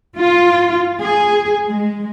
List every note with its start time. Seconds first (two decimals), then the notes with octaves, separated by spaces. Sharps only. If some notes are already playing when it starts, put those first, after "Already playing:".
0.19 F4
0.98 G#4
1.69 G#3